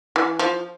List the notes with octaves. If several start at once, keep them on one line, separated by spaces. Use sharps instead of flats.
E3
F3